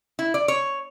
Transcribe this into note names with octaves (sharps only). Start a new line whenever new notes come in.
E4
D5
C#5